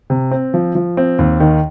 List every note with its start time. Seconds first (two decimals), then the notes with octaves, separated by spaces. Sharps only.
0.10 C3
0.31 C4
0.54 F3
0.75 F3
0.97 C4
1.19 D#2
1.40 D#3